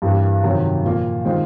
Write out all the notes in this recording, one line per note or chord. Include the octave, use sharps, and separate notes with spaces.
G2 E3 G3 A#3
F2 C3 D#3 F#3
A#2 F3 A#3
D#3 G#3 C4 F4